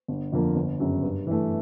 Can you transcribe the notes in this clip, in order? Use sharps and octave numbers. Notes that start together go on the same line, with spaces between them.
G1
F2 D3 F3 A#3
G1
F#2 C#3
G2
E3 A3